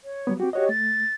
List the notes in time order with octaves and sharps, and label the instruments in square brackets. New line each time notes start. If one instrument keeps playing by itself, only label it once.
[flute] C#5
[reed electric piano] F#3 G3 B3
[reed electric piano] C4 F#4 [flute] G4
[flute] F#4 [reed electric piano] G4 C#5 D#5
[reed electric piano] A3 [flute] A6